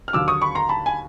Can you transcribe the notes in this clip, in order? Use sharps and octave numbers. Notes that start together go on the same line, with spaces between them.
F6
D#2 D3 F#3 D6 E6
C#6 D#6
B5 C#6
A#5 C6
A5 B5
G#5